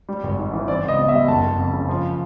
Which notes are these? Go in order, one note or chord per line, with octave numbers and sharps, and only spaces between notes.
G3
G#1
G#2
E3
C4 D5
C#2 D#5
B2
E5
G3
F#1 A5
F#1
F2
C#3
F3